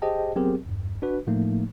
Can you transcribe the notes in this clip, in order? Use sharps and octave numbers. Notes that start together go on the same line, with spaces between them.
G4 G#4 C5 D#5 G5 A5
F#3 B3 C4 G4 G#4 A#4
E2 G2
D4 F#4 B4
A2 F3 A3 A#3 D#4